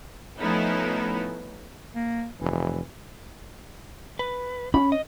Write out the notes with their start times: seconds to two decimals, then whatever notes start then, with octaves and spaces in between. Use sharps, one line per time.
0.39 F3 A3 B3 C#4 D#4 E4
1.95 A#3
2.40 F1 E3
4.19 B4
4.74 C#4 B5
4.92 D#5